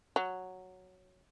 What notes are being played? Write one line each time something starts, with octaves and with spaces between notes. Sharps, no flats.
F#3